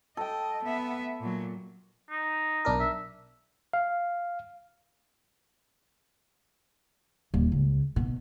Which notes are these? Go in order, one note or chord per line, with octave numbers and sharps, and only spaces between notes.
A4 D#5 G5
B3 E5
A#2 F#3
D#4
B1 D4 A#4
E5
F5
D#1
C#2
B2